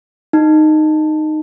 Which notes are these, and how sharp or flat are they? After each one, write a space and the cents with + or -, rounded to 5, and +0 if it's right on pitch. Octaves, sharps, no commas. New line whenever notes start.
D#4 -10